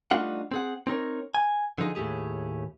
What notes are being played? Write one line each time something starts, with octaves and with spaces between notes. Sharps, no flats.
G3 A3 D4 D#4 F4 F#5
C4 G#4 F#5
C4 D#4 A#4 C#5
G#5
D3 F3 D#4 G#4
D#2 A2 A3 G4 G#4